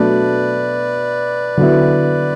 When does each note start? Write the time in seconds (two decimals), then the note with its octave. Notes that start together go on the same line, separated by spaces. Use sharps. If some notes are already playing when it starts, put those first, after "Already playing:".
Already playing: B2 F#3 A3 D4 B4 D5
1.57 D3 F#3 B3 E4